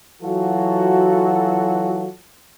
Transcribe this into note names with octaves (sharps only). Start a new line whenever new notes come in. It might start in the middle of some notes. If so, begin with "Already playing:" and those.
E3 F#3 F4 F#4 A4